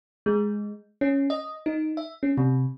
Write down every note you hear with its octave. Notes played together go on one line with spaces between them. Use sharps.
G#3
C#4
D#5
D#4
E5
C#4
C3